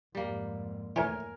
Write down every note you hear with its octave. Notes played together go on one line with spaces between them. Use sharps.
F2 G#2 G3 A#3
A2 E3 A#4 G#5